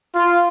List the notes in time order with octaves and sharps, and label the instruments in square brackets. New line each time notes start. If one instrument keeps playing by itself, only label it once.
[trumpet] F4